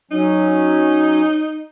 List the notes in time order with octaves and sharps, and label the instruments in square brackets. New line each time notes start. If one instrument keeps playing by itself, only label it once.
[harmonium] F#3 C#4 [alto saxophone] D#4